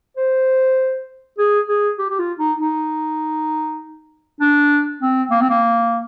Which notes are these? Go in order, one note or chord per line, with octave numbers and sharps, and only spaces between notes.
C5
G#4
G#4
G4
G4
F4
D#4
D#4
D4
C4
A#3
C4
A#3